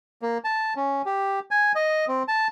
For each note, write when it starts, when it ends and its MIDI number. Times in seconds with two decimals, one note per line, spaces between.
0.22 0.38 58
0.44 0.73 81
0.76 1.02 61
1.06 1.40 67
1.51 1.72 80
1.75 2.05 75
2.08 2.23 60
2.28 2.48 81